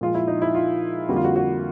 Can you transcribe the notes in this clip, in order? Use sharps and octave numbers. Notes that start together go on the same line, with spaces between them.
A#2 F3 G#3 F4
E4
D#4
E4
F4
F2 D3 G3 A#3 F#4
F4
F#4
F#4